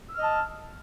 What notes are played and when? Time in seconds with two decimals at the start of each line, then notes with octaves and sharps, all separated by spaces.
0.09 E6
0.13 F6
0.18 D#5
0.22 A5